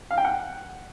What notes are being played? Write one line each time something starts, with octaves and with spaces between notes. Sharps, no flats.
F5
G5
F#5